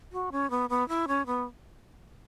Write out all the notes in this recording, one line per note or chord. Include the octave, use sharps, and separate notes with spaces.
F#4
C#4
B3
B3
E4
C#4
B3